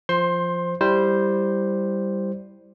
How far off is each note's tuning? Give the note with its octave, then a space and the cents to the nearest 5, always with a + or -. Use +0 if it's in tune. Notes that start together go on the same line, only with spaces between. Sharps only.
F3 -5 C5 +0 C6 +20
G3 +0 E4 +0 C5 +0